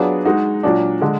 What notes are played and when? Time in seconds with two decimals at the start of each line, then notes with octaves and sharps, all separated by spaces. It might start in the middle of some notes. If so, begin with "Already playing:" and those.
Already playing: F#3 B3 D4 F4 G#4
0.25 G#3 D#4 F#4
0.63 A#2 F#3 D4
1.02 D3 G#3